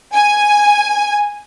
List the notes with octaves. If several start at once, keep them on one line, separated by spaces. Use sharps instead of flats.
G#5